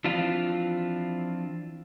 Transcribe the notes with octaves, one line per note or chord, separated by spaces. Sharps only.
E3 F3 C4 D4 F4